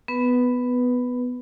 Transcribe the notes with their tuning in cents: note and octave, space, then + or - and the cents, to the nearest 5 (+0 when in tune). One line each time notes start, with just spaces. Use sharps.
B3 +10 B4 -5